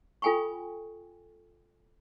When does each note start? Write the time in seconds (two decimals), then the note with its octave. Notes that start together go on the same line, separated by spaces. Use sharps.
0.22 F4 A4 G5 G#5 B5 C#6